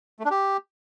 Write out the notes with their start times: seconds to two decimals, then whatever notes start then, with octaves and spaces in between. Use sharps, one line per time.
0.19 A3
0.25 D4
0.31 G4